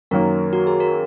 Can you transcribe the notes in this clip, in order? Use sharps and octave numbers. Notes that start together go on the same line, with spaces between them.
F#2 D#3 F#3 A#3 A#4
F#4
G#4
A#4